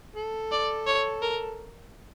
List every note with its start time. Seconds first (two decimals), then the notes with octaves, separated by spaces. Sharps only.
0.16 A4
0.51 D5
0.87 C#5
1.22 A#4